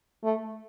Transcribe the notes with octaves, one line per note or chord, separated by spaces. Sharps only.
A3